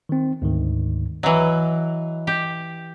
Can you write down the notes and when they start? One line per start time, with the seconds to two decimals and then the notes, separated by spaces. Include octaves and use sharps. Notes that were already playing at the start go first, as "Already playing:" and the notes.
0.09 D#3 C4
0.42 D2 G#2 D#3
1.23 E3 F#3 D#5
2.27 G4